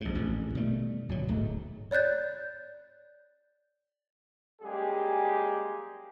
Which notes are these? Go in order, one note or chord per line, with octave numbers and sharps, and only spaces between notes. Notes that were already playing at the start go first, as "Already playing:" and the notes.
A#1 G#2
A1 F2 A#2
B2 D#3 G3 A3
G1 B2 F#3
D1 G#2 G#3 A3
C#5 D5 F#6 G6 A6
F#2 G3 G#3 A#3 G4 G#4